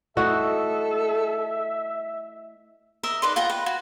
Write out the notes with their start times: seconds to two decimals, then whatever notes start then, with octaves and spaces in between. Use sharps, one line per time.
0.17 A3 E4 F#4 A4 D#5 E5
3.03 A#4 D#5 E5
3.22 D#4 B4 D5 C6
3.36 F4 F#5 G5 A#5
3.50 B4
3.66 F#4